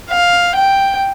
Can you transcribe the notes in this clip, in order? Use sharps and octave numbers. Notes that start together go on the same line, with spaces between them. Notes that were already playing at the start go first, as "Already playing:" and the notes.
F5
G5